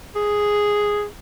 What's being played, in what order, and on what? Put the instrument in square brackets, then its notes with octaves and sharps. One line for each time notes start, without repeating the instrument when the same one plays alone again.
[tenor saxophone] G#4